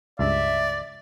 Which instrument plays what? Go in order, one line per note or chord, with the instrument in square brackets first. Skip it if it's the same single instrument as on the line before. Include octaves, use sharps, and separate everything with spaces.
[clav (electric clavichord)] C#2 G2 [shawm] D5 [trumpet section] E5